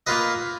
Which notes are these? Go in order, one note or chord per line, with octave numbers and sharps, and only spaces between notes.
A#3 F4 B4 D#5